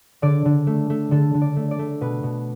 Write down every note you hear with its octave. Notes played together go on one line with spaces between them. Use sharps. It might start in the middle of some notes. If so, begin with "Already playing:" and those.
D3 D5
D3
A3
A3
D3 A4
D3
D5
A3
D5
A3
B2 B4
B2